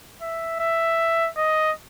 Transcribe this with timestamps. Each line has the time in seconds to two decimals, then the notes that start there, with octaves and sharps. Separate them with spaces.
0.21 E5
0.60 E5
1.37 D#5